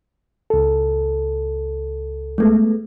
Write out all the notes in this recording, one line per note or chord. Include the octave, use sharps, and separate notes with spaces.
C#2 A4
G#3 A3 B3